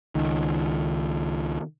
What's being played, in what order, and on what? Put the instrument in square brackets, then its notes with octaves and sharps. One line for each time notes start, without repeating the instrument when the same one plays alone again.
[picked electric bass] C#2 D#3